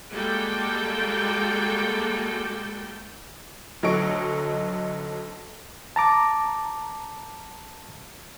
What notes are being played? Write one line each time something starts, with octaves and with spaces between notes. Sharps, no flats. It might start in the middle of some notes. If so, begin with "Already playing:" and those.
G3 G#3 A#3 F#4 A4 G5
D2 F#3 D#4 A4 C#6 D7
A5 A#5 D6